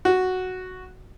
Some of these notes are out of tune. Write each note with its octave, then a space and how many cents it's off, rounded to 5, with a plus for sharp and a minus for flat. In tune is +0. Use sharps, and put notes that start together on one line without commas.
F#4 +0